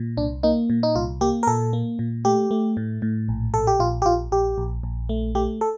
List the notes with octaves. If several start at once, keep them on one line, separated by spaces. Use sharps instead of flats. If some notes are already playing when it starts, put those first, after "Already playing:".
Already playing: A#2
C2 D4
A#3 D#4
A#2
D#4
C2 F4
A#3 G4
A#4
A#2 A4
A#3
A#2
A3 G4
A3
A2
A2
A#1
A#1 A4
G4
A#1 F4
G4
A#1 F4
A#1 G4
A#1
A#1
A3
A3 G4
A4